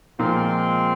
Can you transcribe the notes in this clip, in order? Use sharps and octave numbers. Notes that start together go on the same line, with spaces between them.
A#2 F3 G#3 A#3 C4